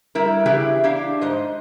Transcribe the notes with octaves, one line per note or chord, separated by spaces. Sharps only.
G3 E4 A#4
C#3 E3 B3 E4 G4 G#4
D4 E4 G4 F5
G#2 C5 D#5